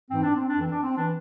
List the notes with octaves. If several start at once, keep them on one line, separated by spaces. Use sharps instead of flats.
G#2 E3 C4
D4
C4
D4
F2
E3 C4
D4
C4
E3 D4